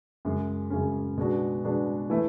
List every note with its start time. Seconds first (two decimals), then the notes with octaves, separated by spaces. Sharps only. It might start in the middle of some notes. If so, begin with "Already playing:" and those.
0.25 F#2 C#3 G#3 C#4
0.70 F#2 C#3 G#3 C#4
1.18 B2 G#3 B3 D4 F#4
1.64 B2 G#3 B3 D4 F#4
2.10 E3 A3 E4